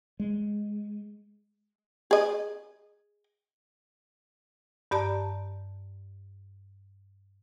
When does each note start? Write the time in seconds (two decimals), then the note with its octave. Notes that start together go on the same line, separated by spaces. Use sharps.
0.20 G#3
2.11 G#4 D#5
4.91 G2 G4 D5 A5 A#5